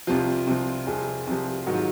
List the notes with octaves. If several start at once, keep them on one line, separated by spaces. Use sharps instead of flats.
C2 C3 F3 F4
C2 C3 F3
C2 C3 F3 G#4
C2 C3 F3
G#2 D#3 F#3 F#4
F4